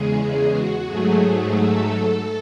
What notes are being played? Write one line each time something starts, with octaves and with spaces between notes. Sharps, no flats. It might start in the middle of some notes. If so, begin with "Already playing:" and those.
Already playing: E2 C#3 G#3 G#4
F#4
G#2 F#3 A3 G#4
A4